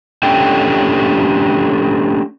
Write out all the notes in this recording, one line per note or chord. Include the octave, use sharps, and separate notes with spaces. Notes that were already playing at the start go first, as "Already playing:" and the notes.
A3 C#4 D4 G4 A4 G5